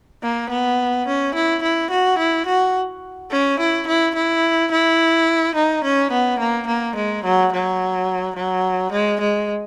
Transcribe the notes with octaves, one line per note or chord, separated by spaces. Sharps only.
A#3
B3
C#4
E4
E4
F#4
E4
F#4
C#4
E4
E4
E4
E4
D#4
C#4
B3
A#3
A#3
G#3
F#3
F#3
F#3
G#3
G#3